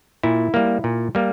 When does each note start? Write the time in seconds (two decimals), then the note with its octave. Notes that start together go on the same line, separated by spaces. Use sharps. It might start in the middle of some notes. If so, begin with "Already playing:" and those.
0.23 A#2 E4
0.54 G3 A#3
0.84 A#2
1.15 G3 A#3